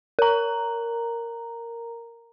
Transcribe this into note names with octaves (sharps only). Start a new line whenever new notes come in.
A#4 A#5